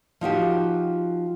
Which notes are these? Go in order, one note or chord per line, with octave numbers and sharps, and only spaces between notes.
F3 D#4 F#4 G4